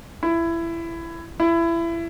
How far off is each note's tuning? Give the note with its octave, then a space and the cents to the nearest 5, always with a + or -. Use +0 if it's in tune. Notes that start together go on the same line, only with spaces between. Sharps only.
E4 +20
E4 +25